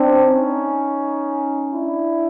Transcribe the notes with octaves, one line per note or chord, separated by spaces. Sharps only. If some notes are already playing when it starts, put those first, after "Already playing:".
Already playing: C4 D4
C#4 D#4
D4 E4